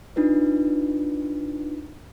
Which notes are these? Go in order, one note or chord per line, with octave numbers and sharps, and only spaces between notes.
D4 D#4 F4 B4